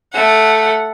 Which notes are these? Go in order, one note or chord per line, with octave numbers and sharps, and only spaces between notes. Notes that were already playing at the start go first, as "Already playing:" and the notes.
A3 F#5